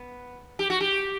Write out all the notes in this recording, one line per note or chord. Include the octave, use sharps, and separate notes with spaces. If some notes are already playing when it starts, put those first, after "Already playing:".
Already playing: B3
G4
F#4
G4